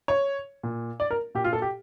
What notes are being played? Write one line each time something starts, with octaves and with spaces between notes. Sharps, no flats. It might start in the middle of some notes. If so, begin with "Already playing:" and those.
C#5
A#2
D5
A#4
A#2 G4
F4
A4
G4